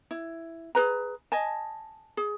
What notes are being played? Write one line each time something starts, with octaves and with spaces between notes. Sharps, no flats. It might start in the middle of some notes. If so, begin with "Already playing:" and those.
E4
G#4 A4 B4 A#5
D#5 G#5 A5
G#4